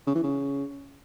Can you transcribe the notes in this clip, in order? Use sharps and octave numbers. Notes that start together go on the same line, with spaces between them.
C#3
E3
C#3